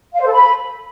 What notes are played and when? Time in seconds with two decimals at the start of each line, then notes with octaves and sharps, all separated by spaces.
0.14 F5
0.20 C5
0.26 A4
0.32 B5